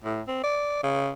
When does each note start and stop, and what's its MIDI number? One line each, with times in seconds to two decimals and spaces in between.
0.04 0.22 45
0.27 0.40 60
0.44 0.81 74
0.83 1.11 49